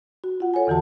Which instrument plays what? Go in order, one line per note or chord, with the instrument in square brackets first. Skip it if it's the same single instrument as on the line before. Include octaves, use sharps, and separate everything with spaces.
[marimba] F#4
F4 F#5
A4 C#5 F#5 G#5
E2 D3 E3 F#4 A5